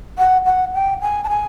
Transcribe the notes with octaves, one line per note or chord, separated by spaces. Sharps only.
F#5
F#5
G5
G#5
A5
G#5